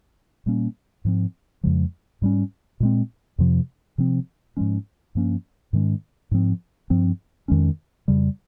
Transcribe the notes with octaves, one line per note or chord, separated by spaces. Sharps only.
A#2 G3 A#3 C#4
G#2 F3 C4
F2 C#3 F3 G#3
G#2 G3 C#4
A#2 G#3 C4
F2 C3 F3
C3 F3 C4
G#2 F3 G#3 C#4
G2 F3 A#3 C#4
G#2 D#3 G#3 C#4
G#2 F3 C4
G2 F3 C4
F2 D#3 G#3 C#4
F2 C#3 G3